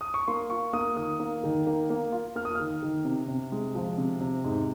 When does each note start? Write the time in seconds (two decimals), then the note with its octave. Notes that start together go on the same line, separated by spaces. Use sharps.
0.01 D#6
0.14 C#6
0.28 A#3 C6
0.50 F4 C#6
0.73 A#3 D#6
0.96 D#3 D#6
1.19 A#3
1.43 D#3
1.67 A#3
1.90 A#3
2.12 F4
2.35 A#3 F6
2.45 D#6
2.55 D#3 F6
2.82 D#3
3.05 C3
3.28 C3
3.52 G#3
3.75 F3
3.98 C3
4.21 C3
4.44 G#2